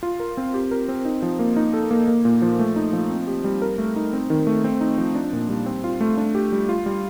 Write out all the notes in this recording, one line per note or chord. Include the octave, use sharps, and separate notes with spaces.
F4
A#4
C4
G4
A#4
C4
D#4
F3
A#3
D#4
A4
A#3
A#3
A#2
F3
A3
D#4
F3
C4
G4
G3
A#4
A3
D#4
C4
D#3
A3
C4
D#4
F3
D4
A#2
G3
C4
F4
A3
D4
G4
G3
F4
G3